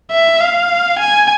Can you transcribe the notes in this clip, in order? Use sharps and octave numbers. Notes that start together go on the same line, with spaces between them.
E5
F5
G#5